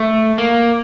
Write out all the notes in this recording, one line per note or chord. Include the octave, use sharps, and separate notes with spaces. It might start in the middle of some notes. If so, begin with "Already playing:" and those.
Already playing: A3
A#3